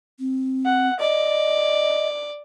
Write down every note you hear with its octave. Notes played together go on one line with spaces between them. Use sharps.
C4
F#5
D5 D#5